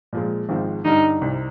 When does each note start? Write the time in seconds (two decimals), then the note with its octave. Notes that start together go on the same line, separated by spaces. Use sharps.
0.13 A#2 F3 G#3
0.49 G#1 G#2 F3 G#3 C4
0.85 G2 D3 G3 D#4
1.22 C2 C3 G3